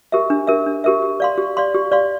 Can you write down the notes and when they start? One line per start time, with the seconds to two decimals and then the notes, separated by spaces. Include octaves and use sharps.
0.12 G4 A#4 E5
0.30 D4
0.47 G4 A#4 E5
0.66 D4
0.84 G4 A#4 E5
1.02 G4
1.20 D5 F5 C6
1.38 G4
1.57 D5 F5 C6
1.74 G4
1.92 D5 F5 C6